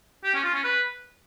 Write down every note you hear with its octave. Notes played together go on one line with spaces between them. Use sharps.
G4
C#4
F4
C#4
B4